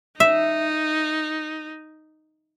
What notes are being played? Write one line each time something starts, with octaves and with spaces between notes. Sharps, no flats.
D#4 E5